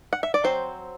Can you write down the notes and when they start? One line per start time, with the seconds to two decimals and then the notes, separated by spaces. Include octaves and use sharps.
0.13 F#5
0.23 E5
0.34 D5
0.44 F#3 C4 C5